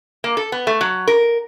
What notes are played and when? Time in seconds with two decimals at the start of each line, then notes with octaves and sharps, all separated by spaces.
0.24 A#3
0.37 A4
0.52 B3
0.67 A3
0.81 F#3
1.08 A#4